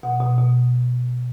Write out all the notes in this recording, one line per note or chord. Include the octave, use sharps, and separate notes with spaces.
B2 F#5
B2
B2